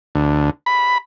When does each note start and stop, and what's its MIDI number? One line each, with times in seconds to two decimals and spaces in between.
0.15 0.50 38
0.66 0.98 83